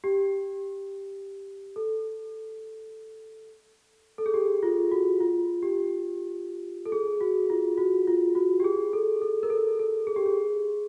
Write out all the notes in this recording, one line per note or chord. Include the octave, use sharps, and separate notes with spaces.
G4
A4
A4
G#4
G4
F4
F#4
F4
G4
A4
G#4
F#4
F4
F#4
F4
F#4
G4
G#4
A4
A4
A#4
A4
A4
G#4
G4
G#4